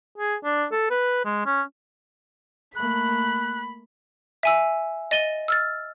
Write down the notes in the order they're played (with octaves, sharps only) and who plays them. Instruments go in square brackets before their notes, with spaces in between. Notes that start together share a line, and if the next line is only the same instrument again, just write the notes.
[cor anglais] G#4
D4
A4
B4
G#3
C#4
[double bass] A3 A#3 [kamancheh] B5 [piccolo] F#6
[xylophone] E5 G#5 E6
D#5 A6 D#7 G7
E6 F6 A6